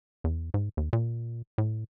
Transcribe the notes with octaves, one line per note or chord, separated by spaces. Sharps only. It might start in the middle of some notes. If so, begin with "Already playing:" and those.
E2
G#2
D#2
A#2
A2